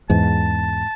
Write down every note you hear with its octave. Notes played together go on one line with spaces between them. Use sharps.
E2 G#2 A5